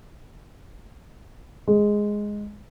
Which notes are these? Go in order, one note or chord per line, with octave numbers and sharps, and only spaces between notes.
G#3